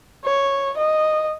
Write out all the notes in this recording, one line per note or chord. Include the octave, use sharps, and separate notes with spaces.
C#5
D#5